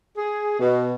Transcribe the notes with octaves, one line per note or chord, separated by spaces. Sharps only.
G#4
B2